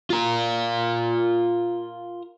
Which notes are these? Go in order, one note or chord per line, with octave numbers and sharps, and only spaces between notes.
F4 A#4